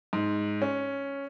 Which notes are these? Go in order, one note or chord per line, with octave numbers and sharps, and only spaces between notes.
G#2
C#4